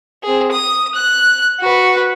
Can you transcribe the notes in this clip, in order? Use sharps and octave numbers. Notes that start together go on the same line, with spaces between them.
C4 G#4
D#6
F#6
F#4 B4